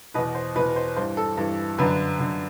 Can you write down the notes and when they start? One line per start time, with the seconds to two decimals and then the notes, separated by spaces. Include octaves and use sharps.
0.14 E2 B2 B4
0.35 C5
0.56 B2 B4
0.59 E2
0.76 C5
0.96 G2 E3 C5
1.17 A4
1.37 G2 E3
1.78 F#2 D3 B4
2.19 F#2 D3